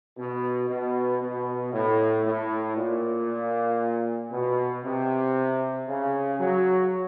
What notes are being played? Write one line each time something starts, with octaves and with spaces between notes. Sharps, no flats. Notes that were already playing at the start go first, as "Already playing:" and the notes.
B2
B2
B2
A2
A2
A#2
B2
C3
C#3
F#3